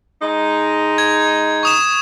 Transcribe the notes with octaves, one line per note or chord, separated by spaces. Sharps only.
G#3 D#4
G#6
C#6 D#6 E7